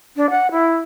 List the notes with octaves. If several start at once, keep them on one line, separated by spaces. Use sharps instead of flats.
D4
F#5
E4